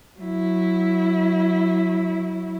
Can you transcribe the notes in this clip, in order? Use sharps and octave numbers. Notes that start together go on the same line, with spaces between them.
F#3 E4